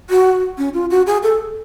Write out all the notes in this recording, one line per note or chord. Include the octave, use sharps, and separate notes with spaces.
F#4
C#4
F4
F#4
G#4
A4